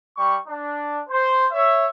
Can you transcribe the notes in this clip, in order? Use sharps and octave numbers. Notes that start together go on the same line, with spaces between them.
G3 C#6
D4
C5
C#5 E5